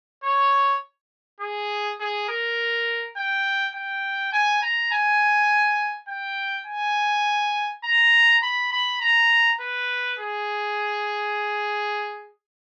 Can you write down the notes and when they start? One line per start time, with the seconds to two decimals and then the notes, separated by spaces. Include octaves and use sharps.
0.24 C#5
1.40 G#4
2.00 G#4
2.29 A#4
3.17 G5
3.75 G5
4.33 G#5
4.62 A#5
4.92 G#5
6.08 G5
6.67 G#5
7.84 A#5
8.43 B5
8.72 B5
9.01 A#5
9.61 B4
10.19 G#4